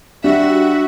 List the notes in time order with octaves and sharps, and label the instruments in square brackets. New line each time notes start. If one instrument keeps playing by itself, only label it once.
[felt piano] G3 [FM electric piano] D4 [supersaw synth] F#4 [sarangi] E5